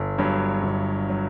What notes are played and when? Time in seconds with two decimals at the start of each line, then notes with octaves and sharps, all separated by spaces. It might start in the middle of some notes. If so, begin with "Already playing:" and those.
Already playing: G1
0.18 G2 F#3
0.63 G1
1.09 F#3